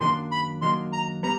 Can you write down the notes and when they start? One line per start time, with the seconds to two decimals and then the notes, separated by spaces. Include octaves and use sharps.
0.01 F#2 D#3 F#3 A#3 D4 C6
0.32 B5
0.61 F#2 D#3 F#3 A#3 D4 C6
0.93 A#5
1.23 G3 B3 A#5